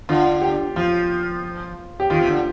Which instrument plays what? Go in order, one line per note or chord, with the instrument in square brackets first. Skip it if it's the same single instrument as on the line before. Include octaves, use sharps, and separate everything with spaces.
[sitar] D3 [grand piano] F4
[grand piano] G4
[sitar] F3 [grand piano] F4
[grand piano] G4
[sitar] D#3 [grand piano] F4
[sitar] C3
D3